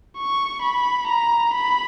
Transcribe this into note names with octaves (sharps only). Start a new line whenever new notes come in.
C#6
B5
A#5
B5